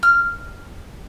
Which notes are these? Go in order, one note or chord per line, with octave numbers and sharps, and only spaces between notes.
F6